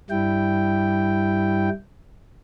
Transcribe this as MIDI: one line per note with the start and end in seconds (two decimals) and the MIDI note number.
0.10 1.70 43
0.10 1.70 55
0.10 1.70 64
0.10 1.70 79